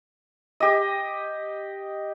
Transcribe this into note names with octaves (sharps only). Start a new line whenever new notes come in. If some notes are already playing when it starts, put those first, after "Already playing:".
G4 D#5